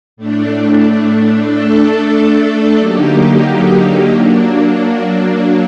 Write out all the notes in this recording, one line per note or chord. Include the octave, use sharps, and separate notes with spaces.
A2 A3 D4
A3 D4 A4
D3 F#3 A#3 D#4 G4
F#3 A#3 D4